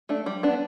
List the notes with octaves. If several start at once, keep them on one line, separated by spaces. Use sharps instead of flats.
A3 D4
G3
B3 D4